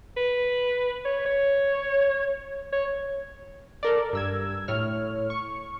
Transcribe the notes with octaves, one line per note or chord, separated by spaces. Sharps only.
B4
C#5
C#5
C#5
A4 A#4 D5
G2 E6 G#6
A2 C#5 F6
C#6